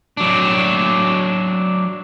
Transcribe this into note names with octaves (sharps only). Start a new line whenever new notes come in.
F#3 D4